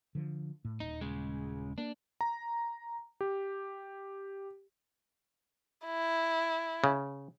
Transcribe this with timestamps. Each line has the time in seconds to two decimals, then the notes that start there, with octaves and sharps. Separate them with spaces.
0.15 D3 F3
0.65 A2
0.80 D#1 D#4
1.01 C#3 G#3
1.78 A#3 D4
2.21 A#5
3.21 G4
5.85 E4
6.84 C#3